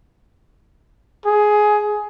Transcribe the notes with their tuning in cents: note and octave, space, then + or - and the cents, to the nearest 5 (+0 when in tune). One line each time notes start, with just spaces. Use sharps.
G#4 +15